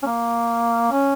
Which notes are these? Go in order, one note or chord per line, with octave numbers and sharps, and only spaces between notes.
C#4
A#3
C#4